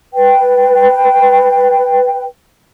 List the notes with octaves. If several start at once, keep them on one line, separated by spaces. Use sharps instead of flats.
B4 G5